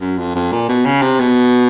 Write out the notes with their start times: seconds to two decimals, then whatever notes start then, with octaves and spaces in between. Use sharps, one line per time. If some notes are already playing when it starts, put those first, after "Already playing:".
0.01 F#2
0.18 F2
0.35 F2
0.52 A#2
0.69 B2
0.85 C#3
1.02 C3
1.20 B2